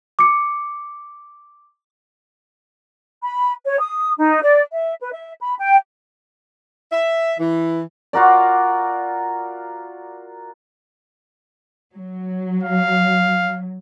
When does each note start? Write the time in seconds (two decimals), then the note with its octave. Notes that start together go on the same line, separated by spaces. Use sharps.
0.19 D6 C#7
3.23 B5
3.66 C#5
3.80 D#6
4.17 D#4
4.42 D5
4.72 E5
5.01 B4
5.13 E5
5.41 B5
5.60 G5
6.92 E5
7.39 E3
8.13 F4 F#4 A#4 D5
11.94 F#3
12.63 F5